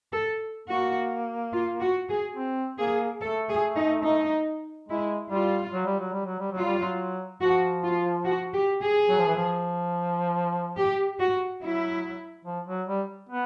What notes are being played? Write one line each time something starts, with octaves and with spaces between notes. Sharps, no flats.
A4
A#3 F#4
F4
F#4
G#4
C4
A#3 G#4
A3 A4
G#4
D#4
D#4
G#3 E4
G3 F4
F#3
G3
F#3
G3
F#3
G3
F#3
F4
G3
F#3
F3 F#4
F4
F#4
G4
G#4
F#3
F3
E3
F3
G4
F#4
F#3 E4
F3
F#3
G3
B3